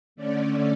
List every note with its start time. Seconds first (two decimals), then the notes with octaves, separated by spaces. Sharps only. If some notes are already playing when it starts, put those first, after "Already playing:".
0.16 D3 A3 C#4 D5